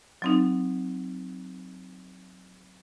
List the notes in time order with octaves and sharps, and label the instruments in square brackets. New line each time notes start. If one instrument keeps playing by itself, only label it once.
[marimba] F#3 C4 D#4